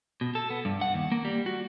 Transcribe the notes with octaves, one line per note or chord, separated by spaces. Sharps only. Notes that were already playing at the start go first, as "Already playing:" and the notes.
B2
A4
B3
G2
F#5
D#2
A#3
G3
F#4